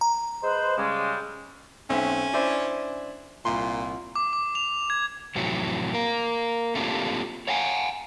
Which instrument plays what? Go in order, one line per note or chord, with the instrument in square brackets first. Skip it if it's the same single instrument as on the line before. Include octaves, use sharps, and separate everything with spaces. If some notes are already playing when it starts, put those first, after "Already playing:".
[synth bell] A#5
[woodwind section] G#3 B4 C5
C#3 G3 G#3
[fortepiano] B1 C4 E5 [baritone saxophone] C#4
[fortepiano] D4 E4 C5
[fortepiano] C2 C6 [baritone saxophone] A#2
[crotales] D6
D6
F7
G#6
[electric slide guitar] F2 A2 C3 E3 F#3
A#3 A#4
A3 A#3 C4 D4 F4 G4
C#5 F5 F#5 G#5